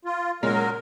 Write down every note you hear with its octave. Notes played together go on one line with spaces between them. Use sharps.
F4
A#2 F#3 G#3 C#4 A#4